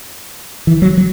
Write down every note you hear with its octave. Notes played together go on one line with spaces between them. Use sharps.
E3
F#3
F#3